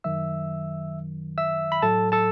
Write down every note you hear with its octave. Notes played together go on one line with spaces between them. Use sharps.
F#2 D#3 F#3 E5 E6
E5 E6
B5
A2 F#3 A4 A5
A4 A5